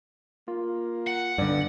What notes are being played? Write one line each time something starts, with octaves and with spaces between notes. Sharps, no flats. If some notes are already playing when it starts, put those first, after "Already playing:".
A#3 F4
F#5
G2 D3 D5